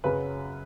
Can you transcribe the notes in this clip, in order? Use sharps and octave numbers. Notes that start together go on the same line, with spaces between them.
F#2 C#3 F#3 B4